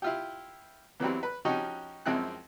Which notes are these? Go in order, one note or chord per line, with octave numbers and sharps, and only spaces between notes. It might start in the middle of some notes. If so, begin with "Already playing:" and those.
E4 F4 G4
E2 E3 F#3 G3 C4
B4
F3 C#4 D#4 F#4 G4 C#5
F#2 F3 G#3 C4 E4 F#6